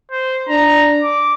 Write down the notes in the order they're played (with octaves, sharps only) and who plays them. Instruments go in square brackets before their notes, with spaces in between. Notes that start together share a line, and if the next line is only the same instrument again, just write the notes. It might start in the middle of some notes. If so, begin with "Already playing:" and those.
[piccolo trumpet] C5
[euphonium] D4 [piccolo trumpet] A#5
[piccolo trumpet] D6